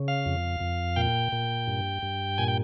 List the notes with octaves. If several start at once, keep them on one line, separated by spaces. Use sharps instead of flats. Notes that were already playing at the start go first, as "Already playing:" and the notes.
Already playing: C#3
F5
F2
F2
A#2 G5
A#2
G2
G2
A#2 G#5
G5